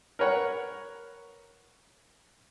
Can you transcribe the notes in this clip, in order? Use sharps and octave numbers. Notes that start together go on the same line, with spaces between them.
A#4 B4 C#5 F#5